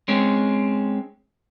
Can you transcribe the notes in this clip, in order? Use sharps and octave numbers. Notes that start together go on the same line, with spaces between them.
G#3 C4 C#4